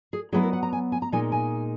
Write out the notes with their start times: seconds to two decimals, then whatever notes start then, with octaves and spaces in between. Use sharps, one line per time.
0.13 G#4
0.32 F#3 B3 E4 G#4
0.43 A#4
0.53 F#5
0.63 A#5
0.73 G#5
0.92 G#5
1.02 A#5
1.12 A#2 G#3 D#4 G#5
1.32 G#5